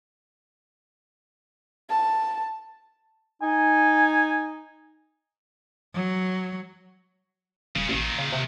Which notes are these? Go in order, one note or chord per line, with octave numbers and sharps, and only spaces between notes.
A5
D#4 G#5
F#3
D#1 C#3
A1 A#2 D#3
C#3
C3